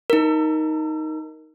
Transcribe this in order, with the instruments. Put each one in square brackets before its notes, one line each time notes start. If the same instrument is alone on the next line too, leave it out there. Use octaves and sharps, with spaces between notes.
[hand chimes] D#4 A#4